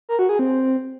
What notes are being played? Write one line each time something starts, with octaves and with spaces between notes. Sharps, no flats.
A#4
F#4
G#4
C4